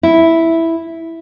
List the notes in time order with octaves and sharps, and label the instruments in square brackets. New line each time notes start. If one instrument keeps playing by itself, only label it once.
[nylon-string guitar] E4